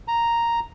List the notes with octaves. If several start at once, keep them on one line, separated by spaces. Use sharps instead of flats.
A#5